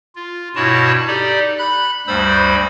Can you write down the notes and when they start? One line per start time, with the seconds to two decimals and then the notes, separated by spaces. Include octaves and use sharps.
0.16 F4
0.55 G2 B2 E4 F#4 C#5 A5
1.07 D#4 G4 A4 D5
1.58 B5 F#6
2.07 D2 G2 G3 C5 B5 E6